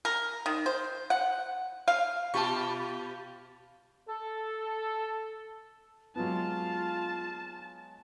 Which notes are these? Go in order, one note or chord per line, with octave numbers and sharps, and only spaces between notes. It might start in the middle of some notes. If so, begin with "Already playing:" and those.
A#4
D#3
C5
F#5
F5
B2 F4 G4 A5 B5 C#6
A4
F#3 G#3 B3 F4 A5